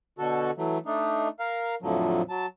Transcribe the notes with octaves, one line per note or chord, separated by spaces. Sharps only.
B2 D3 F#4 A4
E3 F#3 A3
A3 D4 D#4
A#4 F5
F2 A2 D3 F3 F#3
F#3 A5